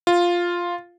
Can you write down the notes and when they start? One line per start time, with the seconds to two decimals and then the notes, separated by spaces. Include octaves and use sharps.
0.07 F4